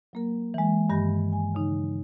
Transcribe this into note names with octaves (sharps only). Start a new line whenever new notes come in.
F#3 A#3 A#4
E3 G#3
G2 D#3 G4 B5 A#6
G#5
C#3 D#4